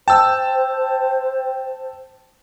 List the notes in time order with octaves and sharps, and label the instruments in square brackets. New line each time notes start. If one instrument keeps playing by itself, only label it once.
[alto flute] C5 [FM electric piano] G5 [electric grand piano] A5 E6